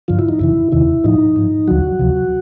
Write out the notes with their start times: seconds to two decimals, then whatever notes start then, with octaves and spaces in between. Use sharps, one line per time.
0.08 G2 D3 F3 F4
0.19 E4
0.29 D#4
0.39 F#2 C#3 E3 E4
0.72 E2 C3 D#3 E4
1.04 A2 F3 D#4
1.36 G#2 F3
1.67 D2 D3 F3 F#3 F#4
1.99 D2 C3 F3